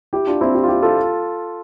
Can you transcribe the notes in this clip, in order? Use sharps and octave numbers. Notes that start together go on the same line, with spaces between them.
E4 G4
D4 F4
C4 E4
E4 G4
F4
E4 G4
F4 A4